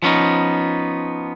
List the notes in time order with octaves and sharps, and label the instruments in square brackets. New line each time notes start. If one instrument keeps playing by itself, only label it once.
[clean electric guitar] F3 B3 C#4 D#4